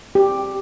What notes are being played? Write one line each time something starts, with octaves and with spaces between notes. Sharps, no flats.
G4